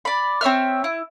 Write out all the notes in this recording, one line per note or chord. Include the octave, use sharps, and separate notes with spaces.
D5 B5
C4 C#5 E5 F6
E4